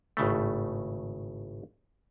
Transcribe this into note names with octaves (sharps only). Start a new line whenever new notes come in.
G#1 A2 C#3 A3